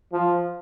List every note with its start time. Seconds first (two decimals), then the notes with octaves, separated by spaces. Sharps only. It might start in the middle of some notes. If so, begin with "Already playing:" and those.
0.12 F3